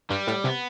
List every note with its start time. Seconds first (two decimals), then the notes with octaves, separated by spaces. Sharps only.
0.10 G2 G3
0.27 A2
0.44 C3 B3